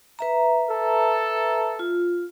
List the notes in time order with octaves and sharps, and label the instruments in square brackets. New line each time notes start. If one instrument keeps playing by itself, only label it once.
[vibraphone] B4 E5 A#5
[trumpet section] A4
[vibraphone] F4